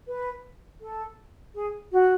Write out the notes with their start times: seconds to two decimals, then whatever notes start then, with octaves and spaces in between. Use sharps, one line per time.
0.07 B4
0.81 A4
1.55 G#4
1.92 F#4